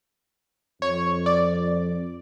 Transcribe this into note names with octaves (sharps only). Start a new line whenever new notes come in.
F2 C#5
D5